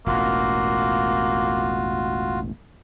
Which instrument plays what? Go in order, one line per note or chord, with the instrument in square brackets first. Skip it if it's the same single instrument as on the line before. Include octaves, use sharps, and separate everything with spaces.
[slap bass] E1 A1 [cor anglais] A#3 [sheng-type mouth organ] F4 F#4